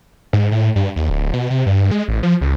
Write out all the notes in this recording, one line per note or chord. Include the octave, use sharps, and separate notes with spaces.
G#2
A2
G2
D#2
D1
B2
C3
G2
G#3
A1
F3
C#2